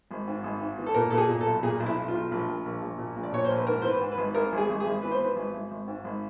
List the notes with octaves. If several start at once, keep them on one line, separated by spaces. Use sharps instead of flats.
G#1
G#2
G#1
G#2
E3
A4
A#2 A#4
A#2 A4
G#4
A#2
A4
B1
A#2 G#4
B1
E4
B1
F4
B1
A#1
A#1
A#1
A#1
A#2
A#1
D5
A#2 C#5
C5
A#1
B4
G#2 A#4
E3 C5
B4
G#2
B4
G#1
G#1 A#4
G#1
G#4
G#1
G#4
G#1
E3 B4
C5
E3 B4
G#1
G#1
G#1
G#2
G#1